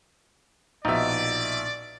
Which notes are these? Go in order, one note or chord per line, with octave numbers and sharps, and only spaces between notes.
A#1 B2 D#4 D5 E5